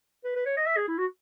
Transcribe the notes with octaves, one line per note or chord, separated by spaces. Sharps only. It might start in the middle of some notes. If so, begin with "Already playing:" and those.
B4
B4
C#5
D#5
E5
G#4
E4
F#4